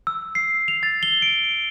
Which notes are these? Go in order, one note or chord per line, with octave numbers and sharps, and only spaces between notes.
E6
C7
F7
A6
G7
D7